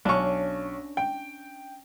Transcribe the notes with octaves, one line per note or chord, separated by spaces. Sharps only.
B1 C#4 D4 C#6
G5